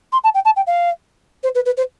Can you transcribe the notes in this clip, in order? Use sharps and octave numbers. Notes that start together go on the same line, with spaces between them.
C6
A5
G5
A5
G5
F5
C5
B4
B4
C5